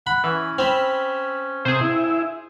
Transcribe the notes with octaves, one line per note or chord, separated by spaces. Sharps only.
F#5 B5
E3 C#4
C4 B5 E6 F6
C3 G#4 C5
E4